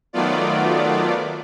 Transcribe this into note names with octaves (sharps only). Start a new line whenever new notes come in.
D#3 F#3 A3 B3 F4 D5